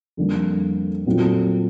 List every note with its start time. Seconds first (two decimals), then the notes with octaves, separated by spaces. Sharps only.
0.17 F2 D3 G3 A#3
1.06 A#2 F#3 A3 C4 F4